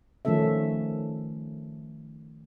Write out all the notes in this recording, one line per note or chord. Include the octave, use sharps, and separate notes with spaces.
D#3 F3 A3 C#4 A4 E5